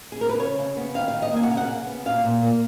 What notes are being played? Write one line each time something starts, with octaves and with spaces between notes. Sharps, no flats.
G#4
A#4
B4
C#3 C#5
C#3
B3
D#3 F5
F5
D#3
D#5
A#3 G#5
F#5
C#3 F5
F#5
C#3
B3
A#2 F5
A#2
A#3